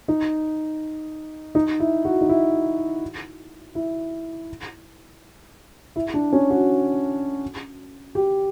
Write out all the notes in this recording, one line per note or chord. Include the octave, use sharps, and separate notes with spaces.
D#4
D#4
E4
F#4
D#4
E4
E4
E4
D4
C#4
F#4
G4